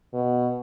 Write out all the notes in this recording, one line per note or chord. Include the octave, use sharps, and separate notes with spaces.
B2